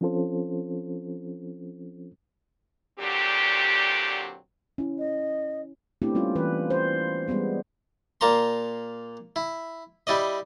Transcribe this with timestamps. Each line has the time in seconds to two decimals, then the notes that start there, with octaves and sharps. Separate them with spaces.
0.01 F3 C4 C#4 F4 A4 C5
2.99 A#2 D3 F#3 C4 G4
4.78 C#4 E4
4.99 D#5
6.02 A3 B3 C4 D4 E4 G4
6.15 G3 A#3 C#4 F4
6.35 E3 B4
6.70 C5
7.28 G3 G#3 B3 G#4
8.21 A#2 A#3 A5 A#5 C6
9.36 E4
10.07 G3 E4 D5 D#5